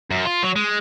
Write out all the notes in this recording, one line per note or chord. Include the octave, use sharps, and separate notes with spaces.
F#2
F4
F#3
G#3